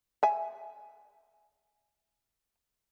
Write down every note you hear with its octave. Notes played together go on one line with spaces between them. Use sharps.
E5 G#5